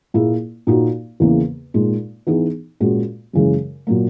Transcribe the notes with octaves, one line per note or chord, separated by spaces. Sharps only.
A#2 A#3 E4 G#4
A#2 A#3 D#4 F#4
E2 C#3 E3 A#3
A#2 G#3 D#4
E3 B3 D#4 G#4
A#2 G#3 C#4 F#4
F#2 C#3 E3 G#3
A#2 F#3 A#3